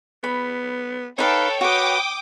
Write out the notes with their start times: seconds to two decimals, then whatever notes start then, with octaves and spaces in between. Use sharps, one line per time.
0.24 B3 B5
1.19 D#4 A4 B4 C#5 F5 G5
1.61 F#4 B4 G5 D6 D#6